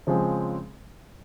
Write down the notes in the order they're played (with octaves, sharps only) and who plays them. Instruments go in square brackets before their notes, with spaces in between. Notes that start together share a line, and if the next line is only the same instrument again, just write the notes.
[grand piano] C#3 F3 G#3 C4